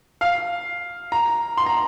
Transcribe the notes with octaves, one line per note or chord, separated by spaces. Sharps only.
F5
A#5
C6
A#5